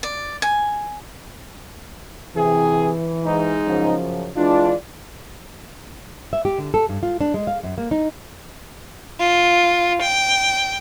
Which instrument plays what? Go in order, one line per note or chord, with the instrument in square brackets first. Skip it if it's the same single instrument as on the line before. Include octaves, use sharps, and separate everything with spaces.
[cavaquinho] D5
G#5
[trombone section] C3 G#4 [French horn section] E3
[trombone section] G#2 D#4
[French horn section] F#2 C#3 F3
[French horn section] E3 G#3 F4 [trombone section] D4
[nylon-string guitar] E5
G4
D3
A4
G2
F4
D4
G#3
F5
F#2
A#3
D#4
[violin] F4
G5